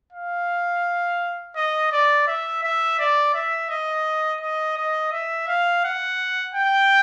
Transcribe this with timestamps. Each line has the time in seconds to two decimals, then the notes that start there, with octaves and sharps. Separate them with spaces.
0.13 F5
1.56 D#5
1.92 D5
2.27 E5
2.63 E5
2.99 D5
3.34 E5
3.70 D#5
4.41 D#5
4.77 D#5
5.12 E5
5.48 F5
5.84 F#5
6.55 G5